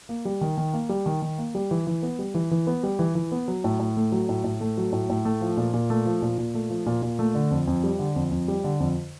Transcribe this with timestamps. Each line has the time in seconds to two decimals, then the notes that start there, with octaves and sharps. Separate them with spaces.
0.09 A#3
0.25 G3
0.41 D#3
0.57 D#3
0.74 A#3
0.89 G3
1.06 D#3
1.22 D#3
1.38 A#3
1.55 G3
1.71 E3
1.87 E3
2.03 B3
2.19 G3
2.34 E3
2.51 E3
2.67 B3
2.83 G3
2.99 E3
3.15 E3
3.32 B3
3.48 F#3
3.64 A2
3.80 A2
3.97 A3
4.12 F#3
4.29 A2
4.44 A2
4.61 A3
4.77 F#3
4.93 A2
5.10 A2
5.25 A3
5.41 F3
5.57 A#2
5.73 A#2
5.90 A3
6.05 F3
6.22 A#2
6.38 A#2
6.54 A3
6.70 F3
6.86 A#2
7.02 A#2
7.19 A3
7.35 D3
7.51 F2
7.67 F2
7.84 G3
7.99 D3
8.16 F2
8.31 F2
8.48 G3
8.64 D3
8.80 F2